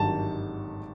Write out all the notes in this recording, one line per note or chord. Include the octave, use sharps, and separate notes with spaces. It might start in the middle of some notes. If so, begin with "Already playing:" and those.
Already playing: G#1 G2 D#3 F#3 A5